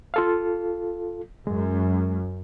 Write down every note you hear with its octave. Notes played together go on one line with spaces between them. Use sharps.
F4 A4 F5
F#2 G#3